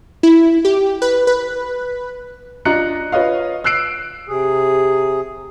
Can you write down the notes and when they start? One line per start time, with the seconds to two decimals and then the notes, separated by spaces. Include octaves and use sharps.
0.23 E4
0.65 G4
1.02 B4
1.27 B4
2.65 D4 F4 D#5 A#5 F#6 C#7
3.12 F4 B4 C#5 D#5 F5
3.64 E6 F#6 C7 D7
4.28 C3 G#4